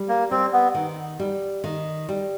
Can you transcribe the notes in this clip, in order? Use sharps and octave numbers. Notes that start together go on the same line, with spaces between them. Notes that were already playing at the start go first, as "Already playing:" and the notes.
Already playing: G3
A#3
G3 C4
B3
D#3
G3
D#3
G3